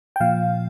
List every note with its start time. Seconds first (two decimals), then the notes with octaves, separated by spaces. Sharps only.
0.16 G5
0.20 A#2 F3 F5